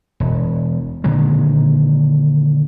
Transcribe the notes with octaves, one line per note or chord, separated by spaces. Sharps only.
E1
A#2 D3 D#3 G#3